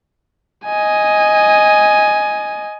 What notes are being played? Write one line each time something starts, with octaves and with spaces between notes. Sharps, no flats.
D#5 G#5